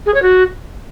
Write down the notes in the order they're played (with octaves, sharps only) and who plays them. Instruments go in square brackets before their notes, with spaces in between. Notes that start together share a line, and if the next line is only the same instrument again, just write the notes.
[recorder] G#4
C#5
F#4